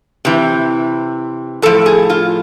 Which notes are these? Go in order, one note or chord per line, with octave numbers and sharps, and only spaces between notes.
C3 E3
A2 F3 A4
G#4
F4